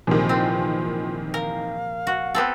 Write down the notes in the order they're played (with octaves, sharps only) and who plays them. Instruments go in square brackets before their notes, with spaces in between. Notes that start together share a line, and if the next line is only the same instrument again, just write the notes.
[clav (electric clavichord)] A#1 C3 [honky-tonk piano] D#3 E3 [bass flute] F4
[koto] C4
[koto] A#4 [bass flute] F5
[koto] F#4
B3 C4 A4